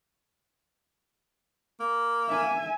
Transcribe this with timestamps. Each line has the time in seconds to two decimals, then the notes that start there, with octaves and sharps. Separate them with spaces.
1.80 A#3
2.28 E5 G#5